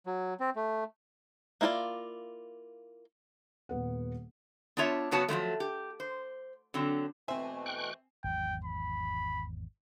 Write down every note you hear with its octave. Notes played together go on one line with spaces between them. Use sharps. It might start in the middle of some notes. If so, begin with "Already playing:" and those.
F#3
C4
A3
A#3 E4 F4 A4 D5
D#1 B3 F#5
B3 D4 F4 C#5 E5
C#3 F#3 B3 F#4 C#5 A5
F3 F#3 G#3 A3
G4
C5
D3 F#3 C4
B2 E3 A3 C4 C5 E5 G#5
G5 C#6 F#6
G#1 E2 F#3 G5
B5